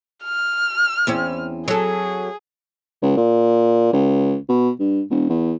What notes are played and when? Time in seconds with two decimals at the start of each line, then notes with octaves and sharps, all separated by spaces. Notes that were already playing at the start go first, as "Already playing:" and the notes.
0.24 F6
1.07 E2 C4 C#4
1.68 F#3 G#4 A4
3.02 C#2
3.17 A#2
3.93 C#2
4.49 B2
4.80 G2
5.10 E1
5.29 E2